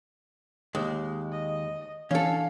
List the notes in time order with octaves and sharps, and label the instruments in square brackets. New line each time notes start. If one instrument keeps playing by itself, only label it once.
[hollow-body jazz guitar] D#2 G#3 [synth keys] E6
[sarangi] D#5
[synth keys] E3 D4 [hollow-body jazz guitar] C#4 A4 [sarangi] F5